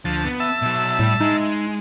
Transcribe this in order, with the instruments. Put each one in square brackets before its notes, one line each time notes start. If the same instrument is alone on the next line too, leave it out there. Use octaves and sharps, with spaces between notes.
[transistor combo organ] D2 A5 [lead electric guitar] F3
[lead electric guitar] B3
[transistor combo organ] E5 A5
[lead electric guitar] B2 F#3
[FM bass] A2 [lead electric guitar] G3 G4
[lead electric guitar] G#3 [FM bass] D#4